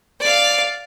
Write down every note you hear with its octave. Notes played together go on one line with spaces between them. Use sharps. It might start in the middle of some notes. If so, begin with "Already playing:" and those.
D5 F5